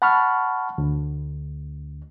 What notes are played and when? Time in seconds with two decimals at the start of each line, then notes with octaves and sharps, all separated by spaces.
0.02 F#5 A5 B5 C#6 F6
0.78 D2